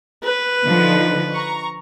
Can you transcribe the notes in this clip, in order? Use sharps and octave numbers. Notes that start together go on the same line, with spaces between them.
B4
D3 F3 D#4
A#5 C#6